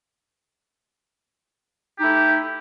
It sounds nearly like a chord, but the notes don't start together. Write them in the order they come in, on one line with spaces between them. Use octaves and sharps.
G4 D#4 E4 A3